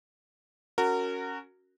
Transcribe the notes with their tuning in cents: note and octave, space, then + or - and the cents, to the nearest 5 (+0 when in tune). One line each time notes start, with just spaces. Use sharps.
C#4 +0 F#4 +0 A#4 -25